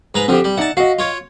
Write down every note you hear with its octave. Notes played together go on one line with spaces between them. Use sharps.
G#2 B4 A#5
D3 F3 C4 G4
G3
D#4 D5 E5 F#5 A5
F#4 D#5 F5
F4 C#5